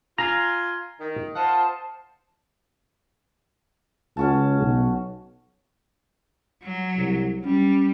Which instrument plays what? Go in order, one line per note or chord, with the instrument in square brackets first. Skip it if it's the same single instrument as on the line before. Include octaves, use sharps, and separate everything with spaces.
[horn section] F4 G#5 [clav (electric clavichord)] A#5
[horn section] D#3
[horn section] F4 D#5 F#5 [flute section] C5 A5
[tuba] C#2 [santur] C#4 F#4 A5
[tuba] B1
[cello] F#3
[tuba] C2
[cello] G3 [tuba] C#4